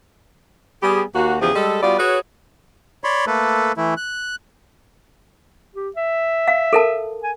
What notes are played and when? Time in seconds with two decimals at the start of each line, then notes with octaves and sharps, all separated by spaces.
0.83 G3 B3 G4 G#4
1.15 D#2 A#3 F#4
1.41 E2 C#3 F3 G4 G#4
1.55 G3 G#3 A4
1.83 G3 B3 F4 F#4 D5
1.99 F#4 G#4 B4 C#5
3.04 C#5 D5 B5 C6
3.27 A3 A#3 A4 B4
3.77 E3 A3 E4
3.97 F#6
5.76 G4
5.96 E5
6.48 F5
6.73 A4 A#4 A5
7.23 G#5